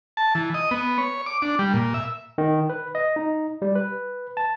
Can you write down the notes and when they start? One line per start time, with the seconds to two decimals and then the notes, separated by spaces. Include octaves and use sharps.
0.17 A5
0.35 E3
0.54 D#5
0.71 B3
0.98 C#5
1.26 D6
1.42 D4
1.59 G3
1.74 A#2
1.94 E5
2.38 D#3
2.70 B4
2.95 D#5
3.16 D#4
3.62 G3
3.75 B4
4.37 A5